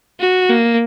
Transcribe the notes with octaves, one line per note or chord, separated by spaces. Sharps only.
F#4
A#3